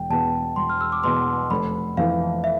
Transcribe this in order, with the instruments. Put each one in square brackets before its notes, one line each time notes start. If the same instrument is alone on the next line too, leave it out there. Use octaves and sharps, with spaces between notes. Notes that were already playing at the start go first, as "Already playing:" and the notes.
Already playing: [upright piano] E1 [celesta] G5
[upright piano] E2 B2 B3 [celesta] A5
[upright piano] E1 [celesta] C6
[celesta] F6
E6
D6
[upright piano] E2 B2 B3 [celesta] C6
[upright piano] F1 [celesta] B5
[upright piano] F2 E3 [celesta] F5
[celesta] E5